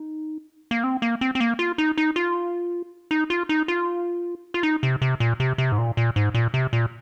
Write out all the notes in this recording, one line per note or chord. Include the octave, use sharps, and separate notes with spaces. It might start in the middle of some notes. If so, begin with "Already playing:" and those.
Already playing: D#4
A#3
C4
A#3
C4
C4
A#3
F4
D#4
D#4
F4
D#4
F4
D#4
F4
F4
D#4
C3
C3
A#2
C3
C3
G#2
A#2
A#2
G#2
A#2
C3
A#2